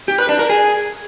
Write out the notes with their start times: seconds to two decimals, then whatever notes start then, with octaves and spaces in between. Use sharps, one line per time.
0.08 G4
0.18 B4
0.29 D4
0.39 A#4
0.50 G#4